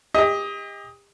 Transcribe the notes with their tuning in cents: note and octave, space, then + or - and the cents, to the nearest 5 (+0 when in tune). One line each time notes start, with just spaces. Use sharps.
G4 +40 D#5 +20